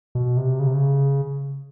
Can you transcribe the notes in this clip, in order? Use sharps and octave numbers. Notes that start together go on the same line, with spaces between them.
B2
C3
C#3
C3
C#3